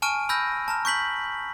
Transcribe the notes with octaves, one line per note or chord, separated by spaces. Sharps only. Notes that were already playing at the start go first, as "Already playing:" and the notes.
G#5 A5 C#6 F6 D7 D#7
B5 E6 F6 G6 A#6
A5 A#5 F6
C#6 G6 B6 F#7